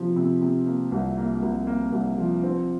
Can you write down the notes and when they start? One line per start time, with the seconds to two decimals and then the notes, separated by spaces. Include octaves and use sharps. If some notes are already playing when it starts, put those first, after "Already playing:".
Already playing: C3 F3 A#3
0.16 C3
0.42 C3
0.66 A#3
0.92 C2
1.17 A#3
1.42 C2
1.67 A#3
1.92 C2
2.18 F3
2.43 C4